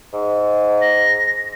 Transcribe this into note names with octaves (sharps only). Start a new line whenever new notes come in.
G#2
A#6